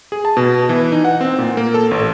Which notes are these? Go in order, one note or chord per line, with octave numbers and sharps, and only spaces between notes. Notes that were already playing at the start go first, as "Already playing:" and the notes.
G#4
A5
B2
E3
D#4
F#5
C4
A#2
A#3
A4
A1